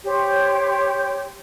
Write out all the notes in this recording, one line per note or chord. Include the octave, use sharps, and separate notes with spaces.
G4 C5 C#5